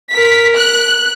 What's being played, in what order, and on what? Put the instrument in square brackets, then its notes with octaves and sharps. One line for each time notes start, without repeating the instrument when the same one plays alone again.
[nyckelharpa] A#4 [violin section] B6
[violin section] F#6